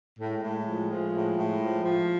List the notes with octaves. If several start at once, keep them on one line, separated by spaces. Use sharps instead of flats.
A2 G#3
A2
F3
F3
A2
A2
F3
F3